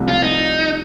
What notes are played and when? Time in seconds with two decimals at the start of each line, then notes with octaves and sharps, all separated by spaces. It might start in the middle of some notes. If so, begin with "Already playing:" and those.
Already playing: C2 C3 F3 A3
0.08 F4
0.23 D#4